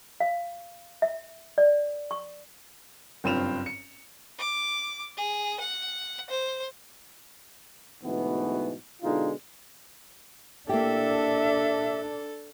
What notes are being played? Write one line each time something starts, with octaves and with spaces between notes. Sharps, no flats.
F5
E5
D5
C#6
F#1 G2 C4 F4 E7 F7
C#7
D6
G#4
F#5
C5
D2 G#2 B2 E3 B3
B2 D3 G#3 D#4 F4
A#3 D4 E4 G4 A4 E5